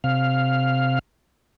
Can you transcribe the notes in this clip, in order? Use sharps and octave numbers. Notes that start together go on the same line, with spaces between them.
C3 F5